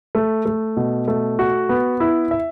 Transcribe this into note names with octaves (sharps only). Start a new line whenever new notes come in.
A3
A3
B2
A3
F#4
B3
E4
E5